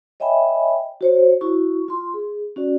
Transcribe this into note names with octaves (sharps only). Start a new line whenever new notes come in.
C#5 D#5 E5 G5 G#5 B5
F#4 C5 C#5
E4 F#4 C#6
F4 C6
G#4
C#4 F#4 D5